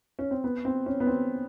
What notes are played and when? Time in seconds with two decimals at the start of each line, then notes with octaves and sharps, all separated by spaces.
0.19 C#4
0.31 C4
0.44 B3
0.65 C4
0.86 C#4
1.00 B3
1.07 C4